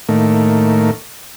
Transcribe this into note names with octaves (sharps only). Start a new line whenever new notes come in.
A2 D#3 A3 A#3